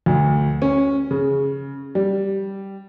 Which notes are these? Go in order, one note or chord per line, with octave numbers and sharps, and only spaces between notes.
D2
C#4
C#3
G3